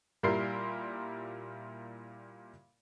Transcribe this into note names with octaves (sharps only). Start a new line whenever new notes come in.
A#2 G3 E4 A#4 C6 C7